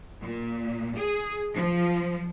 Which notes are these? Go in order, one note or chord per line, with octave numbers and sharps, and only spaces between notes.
A#2
G#4
F3